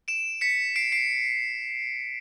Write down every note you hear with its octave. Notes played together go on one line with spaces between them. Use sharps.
D7 E7
B6 C#7
C7 D7
C7 D7